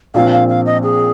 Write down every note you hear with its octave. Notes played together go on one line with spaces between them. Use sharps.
A#1 A#2 F3 C4 F5
F5
F5
D#5
G#4